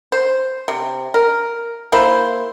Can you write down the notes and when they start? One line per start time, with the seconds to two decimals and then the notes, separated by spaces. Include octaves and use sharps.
0.12 C5
0.68 C3
1.14 A#4
1.92 A#3 E4 C5